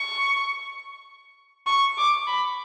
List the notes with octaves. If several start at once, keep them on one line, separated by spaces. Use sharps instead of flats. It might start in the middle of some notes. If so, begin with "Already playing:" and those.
Already playing: C#6
C#6
D6
B5